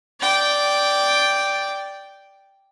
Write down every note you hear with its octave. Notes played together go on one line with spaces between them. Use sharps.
D5 G5